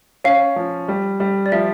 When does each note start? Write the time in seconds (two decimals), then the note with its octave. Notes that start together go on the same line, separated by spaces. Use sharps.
0.24 C#4 F5
0.56 F3
0.88 G3
1.20 G3
1.46 D5
1.52 F3 E5